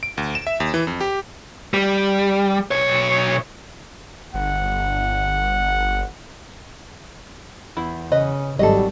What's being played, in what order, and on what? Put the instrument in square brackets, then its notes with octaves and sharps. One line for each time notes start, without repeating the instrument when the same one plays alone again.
[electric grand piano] D7
D2
E7
E5
D#2
E3
F2
G4
[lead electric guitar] G3
B1 C#5
[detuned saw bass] G1 [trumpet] F#5
[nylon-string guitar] E2 [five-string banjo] E4
[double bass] C#3 [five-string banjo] B4 D#5
[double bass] G#1 [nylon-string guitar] F#3 A4 [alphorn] G3 [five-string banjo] D#5